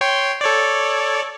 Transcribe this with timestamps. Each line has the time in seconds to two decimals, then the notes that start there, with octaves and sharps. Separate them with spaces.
0.01 C#5 G5 C6
0.41 A4 C#5 D5